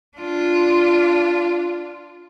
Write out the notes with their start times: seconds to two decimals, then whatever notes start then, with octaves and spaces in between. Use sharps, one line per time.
0.18 D4 F4